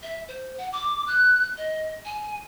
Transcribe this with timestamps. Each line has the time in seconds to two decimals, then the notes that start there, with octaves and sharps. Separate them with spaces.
0.03 E5
0.28 C5
0.58 F#5
0.72 D6
1.07 F#6
1.58 D#5
2.05 G#5